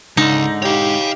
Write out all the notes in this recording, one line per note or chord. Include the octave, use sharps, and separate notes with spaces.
C#2 G#2 D3 D#4
G4 C#5 F5